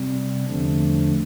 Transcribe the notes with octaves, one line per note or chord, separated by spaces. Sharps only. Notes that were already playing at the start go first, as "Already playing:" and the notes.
Already playing: C3 G3 C4
E2 D3 F3 A3 D4